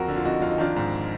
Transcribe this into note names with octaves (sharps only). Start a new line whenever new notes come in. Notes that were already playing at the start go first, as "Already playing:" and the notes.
Already playing: F2 F#4 A#4
D3
F4
F2 D#4 F#4
F2 F4
D#4
D#3 D4 F4
G#2